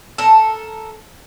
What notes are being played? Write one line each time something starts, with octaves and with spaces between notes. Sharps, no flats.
A4 A#4